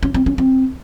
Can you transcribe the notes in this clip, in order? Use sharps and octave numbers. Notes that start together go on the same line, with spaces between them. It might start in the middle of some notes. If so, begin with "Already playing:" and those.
C#4
C4
C#4
C4